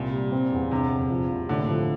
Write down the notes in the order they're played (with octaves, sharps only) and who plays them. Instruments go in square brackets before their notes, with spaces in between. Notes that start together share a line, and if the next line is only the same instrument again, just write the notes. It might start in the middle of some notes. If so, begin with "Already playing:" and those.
Already playing: [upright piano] C2 G3 [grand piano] A#2
[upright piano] G3
C4
E2
[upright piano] G1 [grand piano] C3
[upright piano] F2
F3
C2
[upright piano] A2 [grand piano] D3
[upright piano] F3